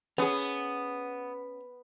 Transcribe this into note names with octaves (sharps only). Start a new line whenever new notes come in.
B3 C#4 G#4